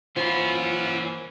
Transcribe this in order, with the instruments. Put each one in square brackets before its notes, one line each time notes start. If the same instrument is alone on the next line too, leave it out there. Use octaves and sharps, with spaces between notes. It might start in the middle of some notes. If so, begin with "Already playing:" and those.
[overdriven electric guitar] E3 A#3 [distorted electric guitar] C#4 F#4 [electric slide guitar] F4 [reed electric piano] C5 B5